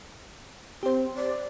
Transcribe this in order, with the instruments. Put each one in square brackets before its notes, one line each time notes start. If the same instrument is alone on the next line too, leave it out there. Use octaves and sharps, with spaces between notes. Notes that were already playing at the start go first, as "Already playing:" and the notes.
[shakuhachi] C4 [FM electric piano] G4 C5
[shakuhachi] D5